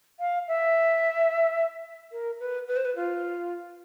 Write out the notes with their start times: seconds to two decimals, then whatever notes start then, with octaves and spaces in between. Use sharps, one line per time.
0.20 F5
0.48 E5
2.12 A#4
2.40 B4
2.68 B4
2.77 C5
2.85 B4
2.96 F4